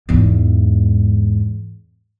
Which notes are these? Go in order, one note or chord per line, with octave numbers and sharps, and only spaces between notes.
E2 G#2